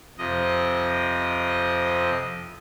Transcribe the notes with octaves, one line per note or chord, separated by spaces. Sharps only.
F2 C3 D#5